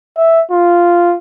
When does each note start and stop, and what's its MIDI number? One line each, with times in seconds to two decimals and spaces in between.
0.17 0.41 76
0.51 1.16 65